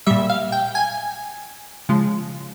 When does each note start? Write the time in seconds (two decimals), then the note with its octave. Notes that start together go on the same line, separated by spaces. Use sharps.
0.06 A#2 G3 E5
0.30 F5
0.52 G5
0.75 G#5
1.89 C#3 F3 G#3